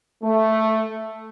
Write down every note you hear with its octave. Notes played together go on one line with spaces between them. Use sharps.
A3